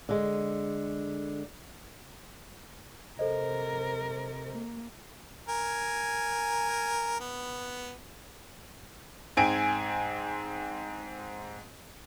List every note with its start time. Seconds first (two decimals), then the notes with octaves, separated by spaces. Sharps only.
0.09 D3 G#3
3.19 C3 A4 A#4 C5 D#5
4.52 A#3
5.49 A#4 G#5
7.20 B3
9.37 G#2 C4 G#5 D7